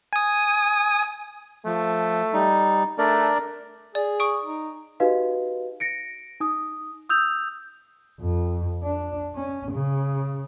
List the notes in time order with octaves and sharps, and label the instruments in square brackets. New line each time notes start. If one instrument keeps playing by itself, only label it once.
[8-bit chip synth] G#5 D#6
[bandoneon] F3 [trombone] A3
[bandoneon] G3 D#4
[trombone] A3 [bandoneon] D4 A#4 D5
[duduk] G#4 [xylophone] D5
[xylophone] C#6 D#6 D7
[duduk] D#4
[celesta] D#4 F#4 G4 B4 D#5 F5
A#6 C#7 D7
D#4 D#6
D#6 E6 G6 F7
[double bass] F2
D4
C#4
C#3